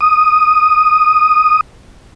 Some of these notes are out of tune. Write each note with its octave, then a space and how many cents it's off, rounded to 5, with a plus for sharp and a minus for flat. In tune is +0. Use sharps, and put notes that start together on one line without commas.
D#6 -5